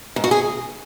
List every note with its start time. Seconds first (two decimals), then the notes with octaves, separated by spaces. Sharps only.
0.16 G#2
0.24 F#4
0.31 G#4